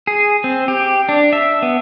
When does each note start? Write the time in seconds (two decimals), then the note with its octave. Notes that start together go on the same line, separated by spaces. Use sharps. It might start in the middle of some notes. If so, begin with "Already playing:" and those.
0.07 G#4
0.44 C4
0.68 G4
1.09 D4
1.33 E5
1.62 B3